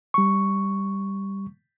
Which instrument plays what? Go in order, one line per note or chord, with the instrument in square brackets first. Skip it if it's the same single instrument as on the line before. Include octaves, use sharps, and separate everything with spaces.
[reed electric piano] G3 C#6